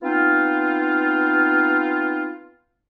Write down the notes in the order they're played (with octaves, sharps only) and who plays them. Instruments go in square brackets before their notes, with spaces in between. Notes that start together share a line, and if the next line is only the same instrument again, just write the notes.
[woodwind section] B3 C4 D#4 F4